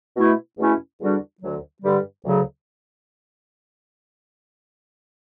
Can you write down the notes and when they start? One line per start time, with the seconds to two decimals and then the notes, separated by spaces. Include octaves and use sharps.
0.16 B2 A3 E4
0.58 E2 B2 A3 C#4 E4
1.00 E2 D3 G3 D4 F#4
1.41 D2 D3 F#3
1.82 G2 D3 G3
2.25 D2 C#3 F#3